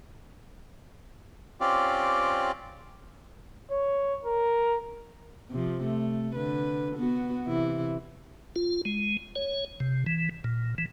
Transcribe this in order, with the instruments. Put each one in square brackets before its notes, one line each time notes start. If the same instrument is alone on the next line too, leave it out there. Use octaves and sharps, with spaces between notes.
[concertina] C4 C#4 F4 G4 D5
[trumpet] C#5
A#4
[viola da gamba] C3 F3
A3
D3 B4
B3 F#4
C3 E3 E4
[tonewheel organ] F4
G#3
C#5
C3
E3
A#2
E3